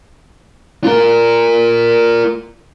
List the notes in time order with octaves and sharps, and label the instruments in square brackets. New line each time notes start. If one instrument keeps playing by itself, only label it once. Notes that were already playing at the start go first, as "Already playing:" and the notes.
[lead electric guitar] F4 A#4